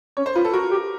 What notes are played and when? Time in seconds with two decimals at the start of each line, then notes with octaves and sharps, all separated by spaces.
0.17 C#4 C#5
0.26 C5
0.35 F4 B4
0.45 A4
0.53 F#4 A#4
0.71 G4